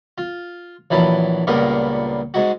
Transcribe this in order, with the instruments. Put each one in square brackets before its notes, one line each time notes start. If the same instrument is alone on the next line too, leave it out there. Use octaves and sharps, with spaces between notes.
[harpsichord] F4
A#1 E3 F#3 A5 B5
C#2 G2 A#2 B3 A#4 C#6
G#2 G#3 F#4